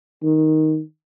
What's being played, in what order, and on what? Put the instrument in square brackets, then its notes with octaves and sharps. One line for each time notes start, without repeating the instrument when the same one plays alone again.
[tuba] D#3